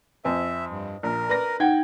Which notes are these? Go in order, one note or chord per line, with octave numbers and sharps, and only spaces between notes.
F2 C4 E5 G#5
G2
A#1 A#4
B4 D5 A#6
D#4 F#5 G5 G#6